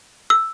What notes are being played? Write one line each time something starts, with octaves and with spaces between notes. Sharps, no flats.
E6